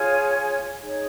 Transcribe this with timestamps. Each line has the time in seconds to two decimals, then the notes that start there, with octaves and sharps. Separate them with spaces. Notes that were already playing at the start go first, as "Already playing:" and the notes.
Already playing: F4 G#4 C#5 G#5
0.82 D#4 G#4 C#5